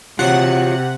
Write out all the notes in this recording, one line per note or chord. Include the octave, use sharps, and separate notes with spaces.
C3 F4 F#4 C#5 F#5